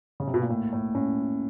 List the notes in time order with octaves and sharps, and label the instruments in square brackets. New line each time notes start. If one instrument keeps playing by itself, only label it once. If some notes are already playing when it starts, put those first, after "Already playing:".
[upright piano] C#3
C3
B2
A#2
[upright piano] A2 [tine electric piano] A#3
[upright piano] A2
[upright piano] A2 [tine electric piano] C#4